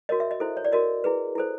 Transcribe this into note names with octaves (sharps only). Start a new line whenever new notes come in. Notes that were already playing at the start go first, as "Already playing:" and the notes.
F#4 A#4 C#5 D#5
E5
D#5
E4 A4 C5
C#5
D5
F#4 A#4 C#5 D#5
E4 G#4 B4
E4 A4 C5